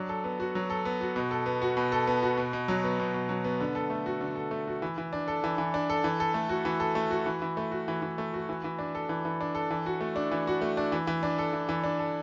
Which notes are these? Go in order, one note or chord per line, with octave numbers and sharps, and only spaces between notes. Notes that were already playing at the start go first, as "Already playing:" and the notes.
Already playing: F#3 D4
A4
B3
F#4
F#3
A4
B3
F#4
B2
A4
B3
F#4
B2
A4
B3
F#4
B2
B2
F#3
B3
B2
B2
F#3
B3
D3
A4
A3
F#4
D3
A4
A3
F#4
E3
E3
D4
A4
E3
E3
D4
A4
E3
A4
A3
F#4
E3
A4
A3
F#4
E3
E3
A3
F#4
E3
E3
A3
F#4
E3
E3
D4
A4
E3
E3
D4
A4
E3
F#4
A3
D4
E3
F#4
A3
D4
E3
E3
D4
A4
E3
E3
D4
A4